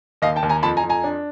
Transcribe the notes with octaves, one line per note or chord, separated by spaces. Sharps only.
D#2 D#5 F5
G5 A5
D#2
G#5 A#5
F2 A5 B5
G#5 A#5
F2
G#5 A#5
D4